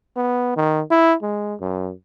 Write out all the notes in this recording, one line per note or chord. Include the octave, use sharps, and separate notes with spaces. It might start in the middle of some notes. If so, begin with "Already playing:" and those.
B3
D#3
E4
G#3
F#2